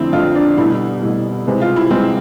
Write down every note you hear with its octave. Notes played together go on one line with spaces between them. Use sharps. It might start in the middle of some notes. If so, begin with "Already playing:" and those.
Already playing: F2 D3 A3 C4 E4
F2 D3 A3 F4
D4
C2 B2 A3 E4
C2 B2 A3
C2 C3 G#3 B3
F4
E4
C2 C3 G#3 B3 C4